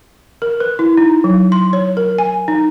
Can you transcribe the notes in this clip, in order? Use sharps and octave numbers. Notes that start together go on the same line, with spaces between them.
A#4
B4
E4
D#4
F#3
C6
C#5
A#4
G#5
D#4